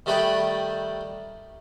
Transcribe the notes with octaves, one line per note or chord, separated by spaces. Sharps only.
D#3 G3 A3 A4 B4 G5